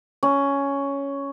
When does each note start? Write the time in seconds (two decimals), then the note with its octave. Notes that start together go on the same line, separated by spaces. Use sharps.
0.23 C#4